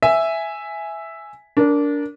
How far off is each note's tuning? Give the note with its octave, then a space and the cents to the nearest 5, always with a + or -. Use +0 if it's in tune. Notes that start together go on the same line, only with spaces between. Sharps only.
E5 +0 G#5 +0
D4 -20 A#4 +0